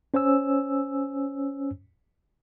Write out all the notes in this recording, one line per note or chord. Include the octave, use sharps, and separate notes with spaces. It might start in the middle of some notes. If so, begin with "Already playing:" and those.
C#4 C5 C#5 G#5 E6